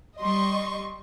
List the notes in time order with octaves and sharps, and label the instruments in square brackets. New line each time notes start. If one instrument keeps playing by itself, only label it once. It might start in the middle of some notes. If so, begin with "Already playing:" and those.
[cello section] G3 [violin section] D#5 C6 C#6